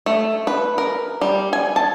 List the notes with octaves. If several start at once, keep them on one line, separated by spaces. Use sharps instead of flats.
A3
B4
A#4
G3
G#5
A5